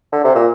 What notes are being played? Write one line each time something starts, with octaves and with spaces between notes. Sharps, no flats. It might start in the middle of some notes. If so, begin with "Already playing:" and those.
D3
C3
A#2